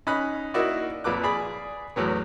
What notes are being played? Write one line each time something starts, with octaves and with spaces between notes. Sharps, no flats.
C#4 D#4 B5 F#6
A#3 D#4 E4 F#4 D5
F2 A#2 B4 D6 F#6
G#4 D5 B5
E2 A2 F#3 B3